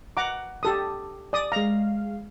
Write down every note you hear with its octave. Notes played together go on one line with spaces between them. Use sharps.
F#5 A#5 D6
G4 A4 D#6
D5 D#6
G#3 F5 A#5